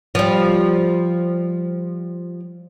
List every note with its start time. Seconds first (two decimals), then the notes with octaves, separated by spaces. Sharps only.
0.15 F3 G3